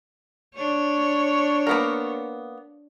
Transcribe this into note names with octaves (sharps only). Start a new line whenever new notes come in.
D4 C#5
A#3 B3 A#4